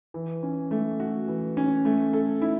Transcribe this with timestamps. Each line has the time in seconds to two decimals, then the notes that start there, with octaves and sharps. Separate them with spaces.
0.14 E3
0.43 C#4
0.71 A3
1.00 F#4
1.28 E3
1.57 C#4
1.85 A3
2.13 A4
2.42 E4